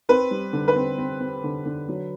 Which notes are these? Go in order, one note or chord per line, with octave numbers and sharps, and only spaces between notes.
C4 B4
G3
D3
B4
C4
C4
C4
D3
D3
F#3